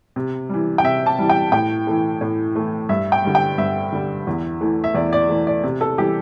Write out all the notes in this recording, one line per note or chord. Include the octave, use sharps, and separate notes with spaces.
C3
E3 G3
G5
C3 E5
A5
E3 G3
G5
A2 G5
E3 A3
A2
E3 A3
G2 E5
G5
D3 G3
G5
G2 E5
D3 G3
E2
E3 A3
E5
E2 D5
D5
E3 A3
D5
C3
A4
E3 G3 G4